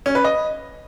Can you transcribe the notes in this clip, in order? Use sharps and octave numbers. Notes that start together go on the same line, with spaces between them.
C#4
B4
D#5